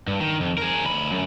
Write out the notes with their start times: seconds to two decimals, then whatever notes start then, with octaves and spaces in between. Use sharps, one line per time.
0.07 G2
0.20 D#3
0.40 F2
0.58 G#4 A#4
0.85 D2 B5
1.11 F#2